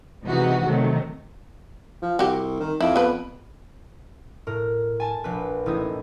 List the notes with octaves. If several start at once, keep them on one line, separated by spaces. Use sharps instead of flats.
C3 E3 G#3 D#4 F#4
C3 D#3 F#3 A3
F3
C2 F#4 G4
D#3
F2 E4
B3 B4
A2 A#4
G#5 A5
A#1 B4
A1 D#4 E4 D#6 G#6